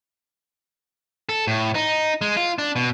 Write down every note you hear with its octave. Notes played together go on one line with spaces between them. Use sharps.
A4
A2
D#4
G#3
F4
D4
B2